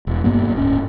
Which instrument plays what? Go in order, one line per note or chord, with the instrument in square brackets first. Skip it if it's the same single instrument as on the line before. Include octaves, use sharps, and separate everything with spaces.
[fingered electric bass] E1
G#1 G2 A#3 B3
D1 C#4